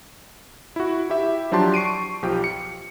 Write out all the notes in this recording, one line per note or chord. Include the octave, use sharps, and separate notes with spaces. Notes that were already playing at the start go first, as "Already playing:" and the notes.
E4 F#4
E4 G4 E5
F3 F#3 D4 G4 A5 C6
C#6 C7 D7 D#7
B1 F3 G4 G5
C#7